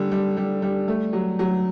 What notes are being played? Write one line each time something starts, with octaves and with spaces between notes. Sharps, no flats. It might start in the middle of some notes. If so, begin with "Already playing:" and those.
Already playing: D3 G3
G3
G3
G3
A3
F#3
F#3